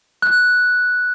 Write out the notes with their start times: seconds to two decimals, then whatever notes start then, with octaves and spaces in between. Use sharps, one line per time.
0.22 F#6